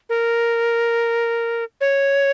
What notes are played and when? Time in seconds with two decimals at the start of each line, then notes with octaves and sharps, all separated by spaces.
0.09 A#4
1.81 C#5